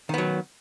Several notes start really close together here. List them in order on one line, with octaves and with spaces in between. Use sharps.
D#3 B3 F#3